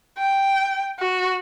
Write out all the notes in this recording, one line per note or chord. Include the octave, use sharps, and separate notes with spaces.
G5
F#4